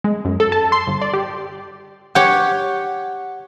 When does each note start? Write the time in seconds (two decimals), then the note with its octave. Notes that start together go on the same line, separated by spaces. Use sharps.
0.04 G#3
0.25 F#2
0.40 A4
0.52 A5
0.72 C6
0.87 G1
1.01 D5
1.13 G4
2.15 G4 C#5 F#5